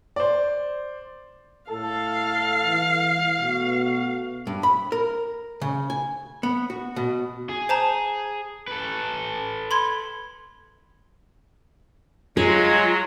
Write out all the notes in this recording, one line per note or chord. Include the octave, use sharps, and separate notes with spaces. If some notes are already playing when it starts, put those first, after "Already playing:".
C5 D5
A2 A4 F5
E3
B2 A3 B3 F#4
G2
B5
A#4
C#3
G#5
B3
F#4
B2
G#4
C5 A5 A#5
A4 B4
B5 C6 G#6
F#3 G#3 F4 G#4